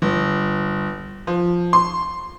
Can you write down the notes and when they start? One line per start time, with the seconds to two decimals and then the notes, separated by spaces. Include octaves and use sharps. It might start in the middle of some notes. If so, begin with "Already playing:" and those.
0.02 G1
1.27 F3
1.73 C6